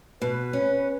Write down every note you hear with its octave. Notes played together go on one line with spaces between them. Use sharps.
B2 B4
C#4